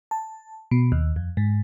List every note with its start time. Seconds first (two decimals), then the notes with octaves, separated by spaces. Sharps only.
0.11 A5
0.71 B2
0.92 D#2
1.16 F2
1.37 G#2